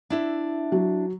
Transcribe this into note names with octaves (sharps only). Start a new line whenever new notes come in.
D4 E4 E5
F#3